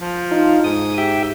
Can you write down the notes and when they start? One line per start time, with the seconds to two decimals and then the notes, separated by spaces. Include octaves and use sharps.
0.01 F3
0.31 D#4 F4
0.64 G#2 D#6
0.98 G4 E5 G5